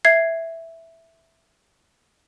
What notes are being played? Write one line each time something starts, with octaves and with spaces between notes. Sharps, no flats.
E5 G#6 C7